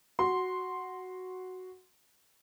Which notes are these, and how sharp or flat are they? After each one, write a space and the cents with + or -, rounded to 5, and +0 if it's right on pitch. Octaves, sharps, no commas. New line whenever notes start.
F#4 +0 C6 +0